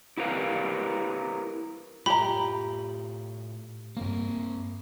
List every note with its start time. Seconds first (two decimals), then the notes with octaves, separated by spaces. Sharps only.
0.17 E4 G4 A#4 B4 F5
2.06 A2 F4 G4 A#5 B5
3.97 G2 A#3 C4 A#4